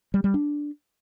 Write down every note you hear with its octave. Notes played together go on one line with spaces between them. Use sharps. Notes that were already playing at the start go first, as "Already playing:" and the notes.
G3
G3
D4